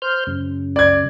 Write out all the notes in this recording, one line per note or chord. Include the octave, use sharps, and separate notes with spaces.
C5 F6 G6
F#2 C#3
D5 G#6